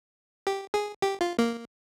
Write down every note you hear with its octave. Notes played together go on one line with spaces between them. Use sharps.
G4
G#4
G4
F4
A#3